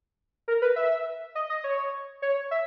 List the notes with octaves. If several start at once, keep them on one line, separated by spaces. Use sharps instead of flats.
A#4
B4
E5
D#5
D#5
C#5
C#5
E5